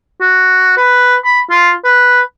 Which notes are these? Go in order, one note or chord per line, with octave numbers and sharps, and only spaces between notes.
F#4
B4
B5
F4
B4